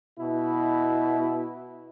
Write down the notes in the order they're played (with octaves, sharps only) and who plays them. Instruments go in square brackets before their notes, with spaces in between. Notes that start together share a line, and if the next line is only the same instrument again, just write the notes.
[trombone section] B2 E4